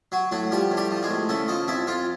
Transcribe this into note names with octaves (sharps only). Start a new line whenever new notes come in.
F#3 F#4
A2 F#3 F#4
F3 G3 G4
A2
G3 G4
F3
G#3 G#4
A2
C#3 A3 A4
F3 D#4 D#5
F2 E4 E5
F2 F4 F5